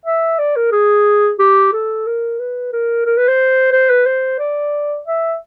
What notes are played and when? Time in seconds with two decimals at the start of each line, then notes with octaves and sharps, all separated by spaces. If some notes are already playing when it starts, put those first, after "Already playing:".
0.05 E5
0.39 D5
0.56 A#4
0.72 G#4
1.39 G4
1.73 A4
2.06 A#4
2.39 B4
2.73 A#4
3.06 A#4
3.17 B4
3.28 C5
3.72 C5
3.90 B4
4.06 C5
4.39 D5
5.07 E5